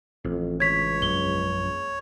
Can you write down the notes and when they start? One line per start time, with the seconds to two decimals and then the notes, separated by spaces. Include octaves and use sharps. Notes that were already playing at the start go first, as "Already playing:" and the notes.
0.24 A1 F2
0.60 C#2 C#5 G#6 B6
1.02 A#1 F#2 F#3 G7